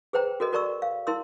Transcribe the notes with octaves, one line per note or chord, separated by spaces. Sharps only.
G#4 B4 C5 G5 A#5
F#4 A4 A#4 D#5
F#4 A#4 D5 A#5 C#6 E6
F5
E4 A#4 C6 E6